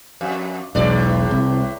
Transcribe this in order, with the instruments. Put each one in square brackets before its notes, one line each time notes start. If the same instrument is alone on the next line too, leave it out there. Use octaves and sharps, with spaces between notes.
[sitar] F2
[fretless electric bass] E1 B1 [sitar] E2 A2 D5
[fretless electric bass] C2